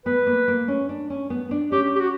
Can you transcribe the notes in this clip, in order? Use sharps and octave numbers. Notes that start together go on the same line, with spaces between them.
B3 B4
A#3
A#3
C#4
D4
C#4
B3
D4
C#4 G4
G4
F#4